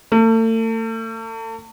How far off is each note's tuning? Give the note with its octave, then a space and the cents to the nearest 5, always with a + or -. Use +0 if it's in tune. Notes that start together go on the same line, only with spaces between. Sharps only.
A3 +40